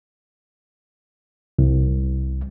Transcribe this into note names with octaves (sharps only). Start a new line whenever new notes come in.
C2